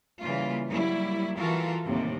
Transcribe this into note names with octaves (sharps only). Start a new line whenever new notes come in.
C#3 E3 G3 A#3 F4
F#3 G3 A#3 E4
E3 F4 F#4 A4 A#4
D#2 A2 C3 G3 A3